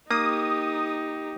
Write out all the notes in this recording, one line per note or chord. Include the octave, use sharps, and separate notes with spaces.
A#3 D#4 G4 D#6